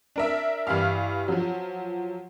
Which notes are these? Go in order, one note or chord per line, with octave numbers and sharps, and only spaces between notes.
D4 A#4 E5
G2 E3 E4 F5 F6
F3 F#3